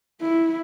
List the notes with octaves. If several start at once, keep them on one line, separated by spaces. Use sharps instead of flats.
E4